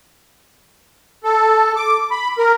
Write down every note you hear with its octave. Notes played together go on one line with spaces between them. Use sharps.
A4
D6
B5
A#4